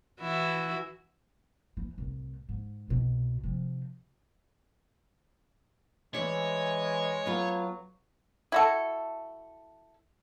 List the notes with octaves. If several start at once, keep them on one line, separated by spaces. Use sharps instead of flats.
E3 E4 F#4
E3
C2 A2
G#2
C2 B2
C3 F3
E3 G#3 C#5 D5 E5
F#3 B3 F4 A4
E4 F#4 A4